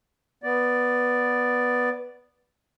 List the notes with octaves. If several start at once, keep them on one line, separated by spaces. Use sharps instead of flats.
B3 D5